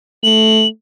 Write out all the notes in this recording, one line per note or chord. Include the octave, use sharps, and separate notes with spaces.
A3 F#7